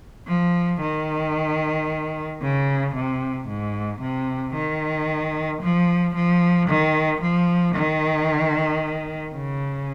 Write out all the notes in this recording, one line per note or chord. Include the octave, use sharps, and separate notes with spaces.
F3
D#3
C#3
C3
G#2
C3
D#3
F3
F3
D#3
F3
D#3
C#3